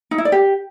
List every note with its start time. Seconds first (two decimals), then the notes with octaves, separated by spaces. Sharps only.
0.11 D#4
0.18 E4
0.25 D5
0.32 G4